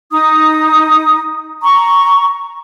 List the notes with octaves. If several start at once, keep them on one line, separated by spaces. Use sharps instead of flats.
D#4 D#6
A#5 C#6